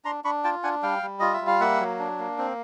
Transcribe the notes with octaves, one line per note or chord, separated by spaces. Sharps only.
D4 A#5 C6
D4 B5 C#6
F4 G5 A5
D4 F#5 G#5
G3 F5 G5
G3
F4 D#5
E5
G3
F5
A#3 E5 F#5
F#3
D4
A#3
C4